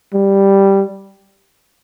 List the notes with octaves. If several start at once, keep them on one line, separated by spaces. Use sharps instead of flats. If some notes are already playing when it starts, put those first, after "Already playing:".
G3